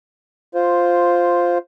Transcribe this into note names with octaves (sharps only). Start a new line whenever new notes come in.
F4 C5